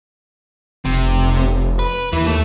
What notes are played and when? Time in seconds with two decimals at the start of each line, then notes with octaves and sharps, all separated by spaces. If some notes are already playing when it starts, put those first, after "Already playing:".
0.85 F1 C3
1.79 B4
2.13 D#2 E3
2.27 A3